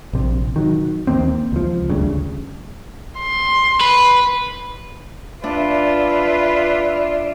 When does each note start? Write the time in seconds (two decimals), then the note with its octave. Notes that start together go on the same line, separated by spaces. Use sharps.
0.13 A#1 C3
0.56 D#3 F#3
1.07 D#2 D#3 A#3 C4
1.52 C#2 F3
1.90 G1 D2 G2 C#3
3.19 C6
3.81 B4
5.44 D4 F4 B4 D5 E5